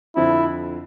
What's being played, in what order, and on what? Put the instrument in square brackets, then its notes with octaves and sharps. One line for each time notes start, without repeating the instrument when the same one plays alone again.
[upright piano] F2 D3 F3 [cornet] E4